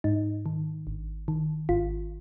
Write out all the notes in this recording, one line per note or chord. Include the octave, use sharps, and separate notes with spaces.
G#2 D#4
D#3
G#1
D#3
G#1 F4